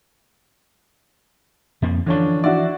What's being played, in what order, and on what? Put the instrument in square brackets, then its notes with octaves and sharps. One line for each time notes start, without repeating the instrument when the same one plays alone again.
[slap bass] F2 F3 A#3
[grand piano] D3 C#4 D4 [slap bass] E3 F3
[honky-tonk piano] D4 E4 F#4 [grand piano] D5